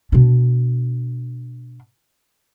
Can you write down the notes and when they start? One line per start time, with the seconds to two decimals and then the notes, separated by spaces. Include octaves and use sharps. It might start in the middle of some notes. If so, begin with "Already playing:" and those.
0.12 B2 D4